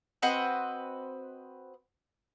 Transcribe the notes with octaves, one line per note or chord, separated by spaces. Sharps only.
C4 F#4 B4 D#5